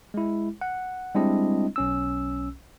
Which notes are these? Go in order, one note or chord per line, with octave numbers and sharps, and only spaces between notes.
G#3 E4
F#5
G3 G#3 C4 D4 E4 D#5
B1 C#4 E6